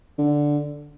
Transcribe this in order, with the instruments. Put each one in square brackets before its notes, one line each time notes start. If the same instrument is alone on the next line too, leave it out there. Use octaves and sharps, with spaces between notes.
[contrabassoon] D3